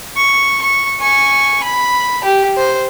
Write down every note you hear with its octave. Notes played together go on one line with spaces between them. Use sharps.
C#6
C#6
G#5 C#6
B5
G4
C5